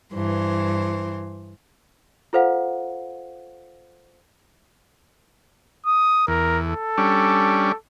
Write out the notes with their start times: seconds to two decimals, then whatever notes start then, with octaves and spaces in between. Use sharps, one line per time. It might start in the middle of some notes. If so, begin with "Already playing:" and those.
0.13 G2 E3 C5
2.33 F4 A4 C5 F5 F#5
5.86 D#6
6.28 E2 A#4
6.65 A4
6.98 G3 C#4 D4